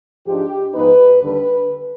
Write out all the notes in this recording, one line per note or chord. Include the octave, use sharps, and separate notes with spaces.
G#2 F3 G#3 D4 G4
G#2 F3 B3 D#4 B4
D#2 D3 G3 D4 B4